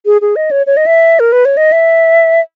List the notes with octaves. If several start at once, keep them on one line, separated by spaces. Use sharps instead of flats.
G#4
G#4
D#5
C#5
C#5
D#5
E5
A#4
B4
C#5
D#5
E5